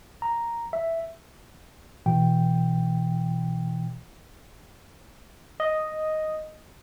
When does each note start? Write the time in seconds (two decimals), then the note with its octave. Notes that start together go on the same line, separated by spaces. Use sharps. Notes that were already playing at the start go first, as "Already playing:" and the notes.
0.22 A#5
0.73 E5
2.06 B2 E3 G5
5.60 D#5